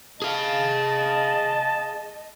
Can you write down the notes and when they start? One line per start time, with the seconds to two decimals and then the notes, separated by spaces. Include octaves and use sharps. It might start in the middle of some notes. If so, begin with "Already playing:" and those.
0.22 G#4 D#5 F5 A5